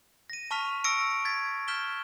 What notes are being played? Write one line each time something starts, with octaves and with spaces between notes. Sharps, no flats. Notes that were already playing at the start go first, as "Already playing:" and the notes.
A#6 D#7
A5 C#6 F6 B6 F7
C#6 E6 A#6 C#7 D7
G#6 A6 B6
F6 G6 B6 E7 G7